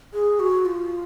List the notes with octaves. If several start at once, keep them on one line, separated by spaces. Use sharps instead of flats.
G#4
F#4
F4